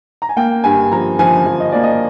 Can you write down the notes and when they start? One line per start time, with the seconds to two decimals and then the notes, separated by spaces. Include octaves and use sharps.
0.22 A#5
0.29 G#5
0.36 A#3 G5
0.64 G2 G#5
0.92 F3 A#5
1.19 F3 G#5
1.46 F3
1.60 D#5
1.72 A#3 D5
1.83 D#5